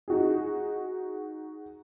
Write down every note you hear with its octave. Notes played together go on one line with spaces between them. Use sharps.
D#4 F#4 G#4